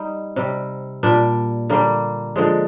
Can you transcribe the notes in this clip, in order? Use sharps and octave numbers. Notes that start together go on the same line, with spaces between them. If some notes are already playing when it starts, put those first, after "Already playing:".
Already playing: G3 D#4
C3 G3
A#2 G3 D4
D3 G3 A#3
D3 F3 G#3